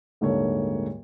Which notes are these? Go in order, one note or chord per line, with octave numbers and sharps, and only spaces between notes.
D#1 G#2 D3 A#3 C#5